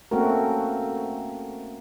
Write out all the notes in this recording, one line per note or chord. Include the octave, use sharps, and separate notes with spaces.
A3 A#3 C4 C#4 F#4 A#4